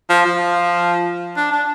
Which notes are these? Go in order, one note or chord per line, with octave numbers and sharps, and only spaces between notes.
F3
F3
D4
D4